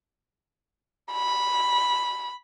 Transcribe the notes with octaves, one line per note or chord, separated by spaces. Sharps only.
B5